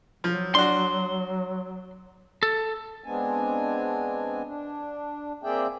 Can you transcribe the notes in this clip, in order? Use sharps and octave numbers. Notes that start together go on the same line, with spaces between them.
F3 F#3
D4 F#4 C6
A4
G#3 B3 C4 D4 G#5
D4
A#3 C4 G#4 D5 E5 G5